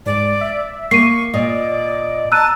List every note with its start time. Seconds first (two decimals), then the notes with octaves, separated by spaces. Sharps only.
0.06 G#2 D5
0.41 E5
0.91 A#3 C#6 C7 C#7 D#7
1.34 A#2 D5 D#5
2.32 A5 A#5 E6 F#6 D#7